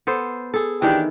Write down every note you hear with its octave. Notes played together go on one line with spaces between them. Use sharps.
B3 A4 C5
G#4 A4
D#3 E3 D4 G4